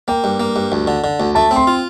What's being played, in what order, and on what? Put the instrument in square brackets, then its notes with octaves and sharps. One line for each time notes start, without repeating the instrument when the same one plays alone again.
[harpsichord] A#3 [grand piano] G5
[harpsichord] G2
A#3
G2
D2
D3
D3
D2
[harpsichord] A3 [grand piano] A5
[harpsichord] C4
[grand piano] C6
[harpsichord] F4